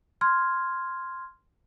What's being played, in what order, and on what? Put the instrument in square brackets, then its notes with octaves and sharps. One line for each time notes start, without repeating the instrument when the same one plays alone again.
[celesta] C6 F6 G#6